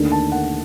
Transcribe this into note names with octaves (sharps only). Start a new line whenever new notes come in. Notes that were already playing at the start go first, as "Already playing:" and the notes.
Already playing: D#2 D3 A3 D4
A5
F#5